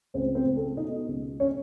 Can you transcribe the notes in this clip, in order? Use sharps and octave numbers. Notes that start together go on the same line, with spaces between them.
C#2 C4 C5
C4 C5
C#2
A4
B2 D#4 D#5
C#2
C#4 C#5